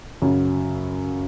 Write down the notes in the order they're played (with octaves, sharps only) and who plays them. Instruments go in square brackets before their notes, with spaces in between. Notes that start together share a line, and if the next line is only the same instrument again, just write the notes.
[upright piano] F#2 C#3 F#3